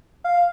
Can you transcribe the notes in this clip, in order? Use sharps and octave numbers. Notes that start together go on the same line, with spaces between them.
F5